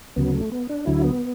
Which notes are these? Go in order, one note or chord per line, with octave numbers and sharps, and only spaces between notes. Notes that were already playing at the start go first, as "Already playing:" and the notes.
D2 C#3 F#3 B3
A3
B3
D4
D2 D3 F#3 E4
B3